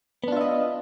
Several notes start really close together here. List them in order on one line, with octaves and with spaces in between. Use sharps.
B3 D4 F4 E5 D#5